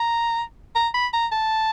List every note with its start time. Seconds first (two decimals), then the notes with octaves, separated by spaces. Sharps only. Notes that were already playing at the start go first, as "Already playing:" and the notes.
Already playing: A#5
0.75 A#5
0.94 B5
1.13 A#5
1.32 A5